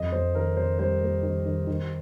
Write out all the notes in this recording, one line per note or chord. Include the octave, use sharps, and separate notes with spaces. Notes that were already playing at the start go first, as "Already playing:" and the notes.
Already playing: F2 D#5
F2 C5
D#3 A#4
F2 C5
G3 C5
A#3
D#3
D#3
D#3